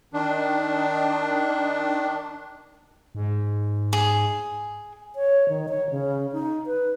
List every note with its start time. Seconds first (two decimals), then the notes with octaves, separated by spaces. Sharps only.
0.14 D#3 D4
3.15 G#2
3.93 G#4
5.16 C#5
5.49 D#3
5.69 C#5
5.90 C#3
6.32 D#4
6.67 B4